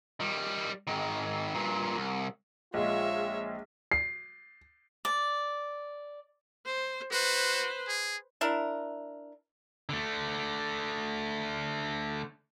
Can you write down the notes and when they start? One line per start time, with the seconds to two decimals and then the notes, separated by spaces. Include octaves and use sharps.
0.20 D#3 G3
0.87 G#2 D#3
1.54 G2 A#2
1.96 C2
2.74 A#1 G#3 F4 C#5 E5
3.92 C7
5.05 D5
6.66 C5
7.11 F#4 B4 C5
7.88 G#4
8.41 D4 E4 A#4
9.89 D3 A3